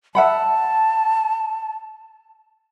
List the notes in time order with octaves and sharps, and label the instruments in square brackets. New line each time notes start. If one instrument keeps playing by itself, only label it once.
[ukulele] E5 F#5 B5 [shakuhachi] A5